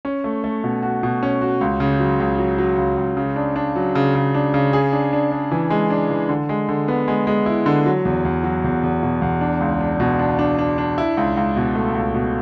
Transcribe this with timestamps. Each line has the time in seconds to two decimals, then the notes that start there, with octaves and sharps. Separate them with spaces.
0.05 C#4
0.24 A3
0.44 A3
0.64 B2
0.83 F#4
1.03 B2
1.23 C#4
1.42 F#4
1.61 C#2
1.80 C#3
2.00 F#3
2.20 C#2
2.39 F#3
2.58 F#3
2.78 C#2
2.97 C#2
3.17 C#3
3.36 D4
3.56 D4
3.76 F#3
3.95 C#3
4.15 C#3
4.34 D4
4.54 C#3
4.73 G#4
4.92 D4
5.13 D4
5.31 D4
5.51 E3
5.70 G#3
5.90 D4
6.10 E3
6.29 D3
6.49 G#3
6.69 D3
6.88 B3
7.08 G#3
7.27 G#3
7.46 E4
7.66 D3
7.86 F#3
8.05 E2
8.25 E2
8.44 F#3
8.64 E2
8.83 E2
9.03 B2
9.22 E2
9.41 D4
9.60 C#2
9.81 D4
10.00 B2
10.19 D4
10.39 D4
10.59 D4
10.78 D4
10.98 E4
11.17 C#2
11.37 C#2
11.56 B2
11.75 A3
11.95 C#2
12.14 B2